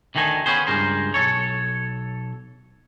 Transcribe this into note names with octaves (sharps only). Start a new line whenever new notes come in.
D2 D#3 A3 D#4 G#5
B3 C#4 G#4 C5
C#2 G2 G#4 A#4 C5
B1 G#2 A4 C#5